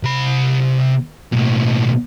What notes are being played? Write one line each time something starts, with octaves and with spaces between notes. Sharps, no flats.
C3 B5
B1 A2